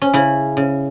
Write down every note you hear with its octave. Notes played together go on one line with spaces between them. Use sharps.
C#4
C#3 E4
C#3